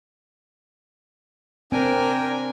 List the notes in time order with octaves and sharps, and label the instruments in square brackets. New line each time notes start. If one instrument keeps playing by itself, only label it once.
[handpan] C4 [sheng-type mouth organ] D4 G5 G#5 [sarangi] A#4